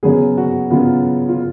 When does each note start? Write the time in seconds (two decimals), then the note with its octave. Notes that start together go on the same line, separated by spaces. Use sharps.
0.03 C#3 F#3 B3 G#4
0.37 F#4
0.70 C#3 F#3 B3 F4
1.29 F4